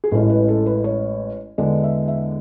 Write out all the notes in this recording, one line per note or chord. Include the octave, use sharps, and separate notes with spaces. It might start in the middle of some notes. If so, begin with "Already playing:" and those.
G#4
A1 A2 G#3 C#4 E4 A4
B4
A4
B4
C#5
E2 D3 G#3 D4 D5
E5
E5